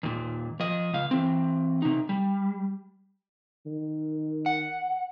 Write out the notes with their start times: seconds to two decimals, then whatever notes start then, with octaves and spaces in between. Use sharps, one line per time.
0.03 D#2 A#2
0.60 F3 D#5
0.93 C#2 F5
1.11 E3 C4
1.82 C3 D#4
2.09 G3
3.66 D#3
4.46 F#5